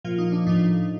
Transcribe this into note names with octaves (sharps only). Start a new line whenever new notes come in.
A#2 F3 F4
D#4
D4
A2 F3 D#4